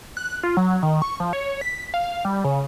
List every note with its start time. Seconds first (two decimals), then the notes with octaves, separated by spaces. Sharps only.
0.17 F#6
0.43 F4
0.57 F#3
0.83 D#3
1.02 C#6
1.20 F3
1.33 C#5
1.61 B6
1.94 F5
2.25 G3
2.44 C#3